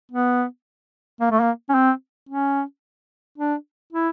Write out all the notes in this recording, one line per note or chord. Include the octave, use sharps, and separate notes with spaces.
B3
A#3
A3
A#3
C#4
C4
C#4
D4
E4